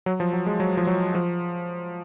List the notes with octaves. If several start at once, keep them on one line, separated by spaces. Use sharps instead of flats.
F#3
F3
F#3
G#3
F#3
F3
F#3
F3